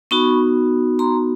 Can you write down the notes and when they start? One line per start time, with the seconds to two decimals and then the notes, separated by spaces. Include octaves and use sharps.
0.11 B3 D#4 F#4 B5 C#6
0.99 A#5 C6